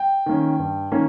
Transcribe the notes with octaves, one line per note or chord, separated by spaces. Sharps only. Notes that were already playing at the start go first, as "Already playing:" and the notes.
Already playing: G5
D#3 A#3 C#4
G2
D#3 A#3 C#4